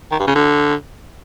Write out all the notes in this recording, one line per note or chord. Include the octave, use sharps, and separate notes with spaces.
D#3
G2
C#3
D3